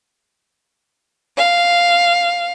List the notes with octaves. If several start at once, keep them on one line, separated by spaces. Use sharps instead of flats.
F5